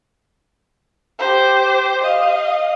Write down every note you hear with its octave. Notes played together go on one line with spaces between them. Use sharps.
G4 C5
D#5 F5